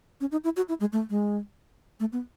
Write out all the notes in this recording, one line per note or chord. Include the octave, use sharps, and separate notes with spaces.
C#4
D#4
E4
F#4
E4
G#3
A3
G#3
A3
B3